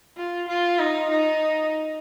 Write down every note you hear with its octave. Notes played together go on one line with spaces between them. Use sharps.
F4
F4
D#4
D#4